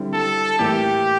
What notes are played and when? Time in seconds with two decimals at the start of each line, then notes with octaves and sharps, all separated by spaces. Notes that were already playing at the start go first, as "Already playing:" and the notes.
Already playing: D3 G3 C4 E4
0.13 A4
0.59 A2 E3 A#3 E4 G4